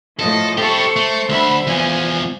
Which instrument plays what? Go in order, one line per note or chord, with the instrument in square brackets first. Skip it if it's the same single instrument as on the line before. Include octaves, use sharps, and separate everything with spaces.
[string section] A2 F3 [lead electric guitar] A4 [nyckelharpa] D#5
[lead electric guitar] E4 G4 [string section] A4 C#6 [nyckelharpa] C5
[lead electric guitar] A3
[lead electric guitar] D2 [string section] E5 B5
[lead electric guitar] E2 F3 [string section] G#5